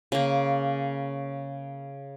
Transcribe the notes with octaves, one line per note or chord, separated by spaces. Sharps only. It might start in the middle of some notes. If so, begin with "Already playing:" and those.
C#3 A#3